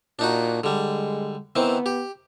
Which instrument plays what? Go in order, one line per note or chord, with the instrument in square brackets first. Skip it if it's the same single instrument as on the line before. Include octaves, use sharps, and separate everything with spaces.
[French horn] A#2 [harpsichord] D4 D#4 F#4
[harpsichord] D3 G3 [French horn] G#3
[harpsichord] D#3 E3 C4 [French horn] B3
[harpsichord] G4